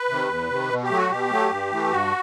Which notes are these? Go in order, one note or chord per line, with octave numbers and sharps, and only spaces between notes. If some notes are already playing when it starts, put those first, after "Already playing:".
Already playing: B4
C3 D#3
E2
C3 D#3
B2
G4
F#3 A3
F#4
B2 G4
F#3 A3
G2
E3 A3
G2 F#4